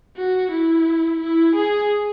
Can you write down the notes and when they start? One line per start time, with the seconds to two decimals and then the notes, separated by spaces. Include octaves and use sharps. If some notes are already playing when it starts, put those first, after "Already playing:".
0.17 F#4
0.51 E4
1.21 E4
1.55 G#4